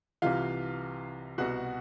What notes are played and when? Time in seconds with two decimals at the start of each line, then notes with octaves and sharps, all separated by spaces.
0.22 C2 C3 E3 F4 F5
1.38 C2 B2 F#4 F#5